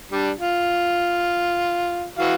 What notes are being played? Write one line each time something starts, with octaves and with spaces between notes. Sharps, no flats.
G3 D4
F4
E3 F#4 F5